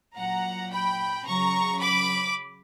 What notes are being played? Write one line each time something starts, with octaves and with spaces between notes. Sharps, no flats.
A#2 F#3 F#5 A#5
G5 B5
C#3 F#3 A#5 C#6
B5 D6